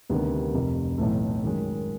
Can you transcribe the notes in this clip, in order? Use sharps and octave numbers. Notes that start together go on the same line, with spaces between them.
D2 C3 D#3 G3 B3
F1 F2 C3
B1 A2 E3 A3
F#2 D#3 G#3